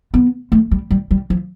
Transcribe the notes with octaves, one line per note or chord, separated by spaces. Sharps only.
B3
A3
G3
G3
G3
F3